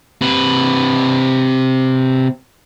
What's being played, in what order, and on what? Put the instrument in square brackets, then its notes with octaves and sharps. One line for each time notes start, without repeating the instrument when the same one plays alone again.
[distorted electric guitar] C3 B4